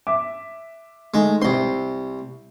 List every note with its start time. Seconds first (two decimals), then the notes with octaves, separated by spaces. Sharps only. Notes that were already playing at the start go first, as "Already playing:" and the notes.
0.07 E5 D6
1.14 D#3 G#3 A3
1.42 C2 C4 C6